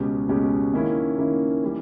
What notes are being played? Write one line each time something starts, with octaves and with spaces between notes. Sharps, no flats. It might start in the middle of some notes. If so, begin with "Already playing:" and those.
Already playing: C#2 B2 G#3 C#4 G4
C#2 B2 G#3 C#4 G4
D#3 A#3 C#4 E4
D#3 A#3 C#4 E4
E3 G3